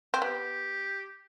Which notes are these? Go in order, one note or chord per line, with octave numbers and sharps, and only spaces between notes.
C4
B3 G4